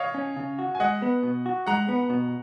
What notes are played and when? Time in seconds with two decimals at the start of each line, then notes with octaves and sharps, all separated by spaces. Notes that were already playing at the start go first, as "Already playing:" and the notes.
Already playing: C#5 D#5 F5
0.14 C#4
0.37 C#3
0.59 F#4
0.75 G#5
0.79 G#3 D#5 F#5
1.02 B3
1.23 B2
1.46 F#4
1.66 G#3 F#5 A#5
1.89 B3
2.10 B2